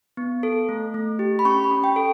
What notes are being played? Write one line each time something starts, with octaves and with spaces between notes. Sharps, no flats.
B3
A4
A3
A3
G4
B5
C#4 C#6
B5
C#4
G5
A4